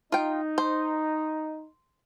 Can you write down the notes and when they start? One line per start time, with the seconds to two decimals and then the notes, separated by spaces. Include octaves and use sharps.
0.12 D#4 F4 G5
0.58 C5